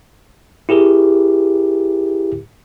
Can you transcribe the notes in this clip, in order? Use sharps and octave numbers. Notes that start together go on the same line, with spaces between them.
E4 G4 G#4 A#4